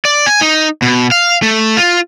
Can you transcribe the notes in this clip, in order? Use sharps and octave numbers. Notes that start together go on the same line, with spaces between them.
D5
G#5
D#4
B2
F5
A3
F4